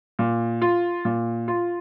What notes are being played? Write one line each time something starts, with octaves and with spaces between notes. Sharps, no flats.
A#2
F4
A#2
F4